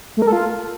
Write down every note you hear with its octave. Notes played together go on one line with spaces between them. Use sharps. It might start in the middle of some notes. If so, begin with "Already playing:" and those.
A3
A#4
A4
F4